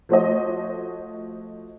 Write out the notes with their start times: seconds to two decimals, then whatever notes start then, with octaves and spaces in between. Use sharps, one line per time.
0.09 F3 A3 F#4 C5 C#5 D#5